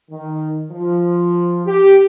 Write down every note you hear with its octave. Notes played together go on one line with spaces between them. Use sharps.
D#3
F3
G4